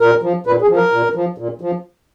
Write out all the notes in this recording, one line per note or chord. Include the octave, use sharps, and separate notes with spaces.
A#2 A#4
F3
A#2 B4
G#4
F3
A#4
A#2
F3
A#2
F3